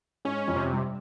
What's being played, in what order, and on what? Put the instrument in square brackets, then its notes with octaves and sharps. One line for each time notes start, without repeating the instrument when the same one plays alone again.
[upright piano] G#2 G#3 [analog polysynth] C#4
[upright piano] F2 F3
[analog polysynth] C3
[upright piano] G2 G3